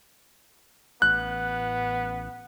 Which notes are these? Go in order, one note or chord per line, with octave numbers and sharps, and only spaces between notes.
A1 B3 F#6